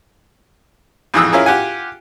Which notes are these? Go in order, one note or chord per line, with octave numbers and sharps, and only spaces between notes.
F2 G#2 E3 G#4 D#6 E6
C#4 E4 F4 G#4 A#4
F4 G4 F#5 G#5